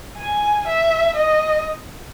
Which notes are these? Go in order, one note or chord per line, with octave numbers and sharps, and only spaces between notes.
G#5
E5
D#5